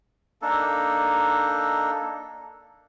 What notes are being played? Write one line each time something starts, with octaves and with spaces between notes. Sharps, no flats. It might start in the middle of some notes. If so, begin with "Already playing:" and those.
A#3 D4 D#4 A4